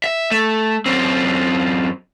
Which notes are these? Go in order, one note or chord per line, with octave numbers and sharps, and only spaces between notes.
E5
A3
F#2 C4